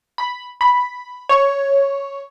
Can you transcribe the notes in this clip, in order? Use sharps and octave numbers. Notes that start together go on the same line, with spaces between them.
B5
B5
C#5